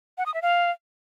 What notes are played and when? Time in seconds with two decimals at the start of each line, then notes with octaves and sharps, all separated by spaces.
0.18 F#5
0.26 D#6
0.34 E5
0.42 F5